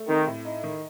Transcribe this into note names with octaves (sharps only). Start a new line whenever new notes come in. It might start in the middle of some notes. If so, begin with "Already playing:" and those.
Already playing: A3
D#3 C4
A2
D#4
D#3